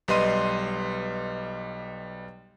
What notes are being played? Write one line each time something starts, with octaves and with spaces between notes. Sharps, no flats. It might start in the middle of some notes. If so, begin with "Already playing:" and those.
B1 G3 B4 D#5 C6 D#7